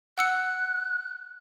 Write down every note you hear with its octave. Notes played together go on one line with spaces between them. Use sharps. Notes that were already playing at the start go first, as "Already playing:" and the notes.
F#5 E6 F#6 C#7